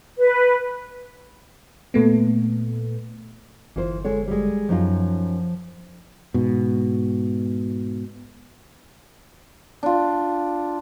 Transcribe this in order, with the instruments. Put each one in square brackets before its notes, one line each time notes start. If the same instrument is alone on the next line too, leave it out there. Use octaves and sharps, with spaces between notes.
[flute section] B4
[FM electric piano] A#2 A3 B3
[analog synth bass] G1 [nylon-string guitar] E3 F4 C5
[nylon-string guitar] G#3 A4 C#5
G3 G#3
[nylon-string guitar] F#2 D#4 F4 [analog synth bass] F3
[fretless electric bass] G#2 B2
[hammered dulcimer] D4 F4